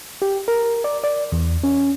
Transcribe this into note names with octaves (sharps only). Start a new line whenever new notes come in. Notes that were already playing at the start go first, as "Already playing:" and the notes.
G4
A#4
D5
D5
E2
C#4